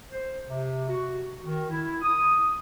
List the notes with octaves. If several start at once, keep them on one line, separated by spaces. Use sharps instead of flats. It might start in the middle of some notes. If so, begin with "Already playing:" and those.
C5
C3
F#4
D#3
E4
D#6